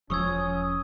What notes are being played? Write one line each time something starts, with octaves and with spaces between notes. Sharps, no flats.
E1 F3 C#4 C#6 D#6 E6 G#6